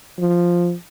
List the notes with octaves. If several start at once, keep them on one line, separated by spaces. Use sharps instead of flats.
F3